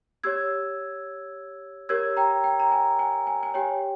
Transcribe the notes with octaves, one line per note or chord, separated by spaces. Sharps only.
G4 C#5 E6 G#6
G4 A#4 C#5 E6 G#6
G5 A#5
G5
A#5
G#5
G#5
G#5
G#5
G4 C#5 G5